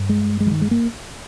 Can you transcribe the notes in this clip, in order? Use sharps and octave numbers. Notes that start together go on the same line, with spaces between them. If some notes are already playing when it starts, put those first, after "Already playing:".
Already playing: G2
G#3
G#3
F3
D#3
G#3
A#3